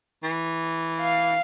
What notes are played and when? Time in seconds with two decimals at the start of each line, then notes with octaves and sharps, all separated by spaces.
0.24 E3
1.00 F5